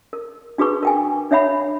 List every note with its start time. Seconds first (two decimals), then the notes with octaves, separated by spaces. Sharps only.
0.13 A#4
0.58 D4 F#4 G#4 B4 C#6
0.83 A#4 G5 G#5
1.31 D4 C#5 E5 F#5 B5